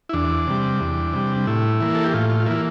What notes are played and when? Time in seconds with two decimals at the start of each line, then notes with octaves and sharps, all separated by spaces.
0.09 E4
0.13 E2 D4
0.47 C3 G3
0.80 E2
1.13 C3 G3
1.47 A2 E4
1.80 E3 A#3
1.95 A4
2.04 G4
2.14 A2 F4
2.30 F4
2.40 F4
2.46 E3 A#3 E4